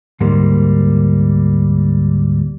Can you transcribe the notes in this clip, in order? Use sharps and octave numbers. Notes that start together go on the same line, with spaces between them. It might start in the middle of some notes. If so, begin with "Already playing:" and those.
D2 G#2 G3 A#3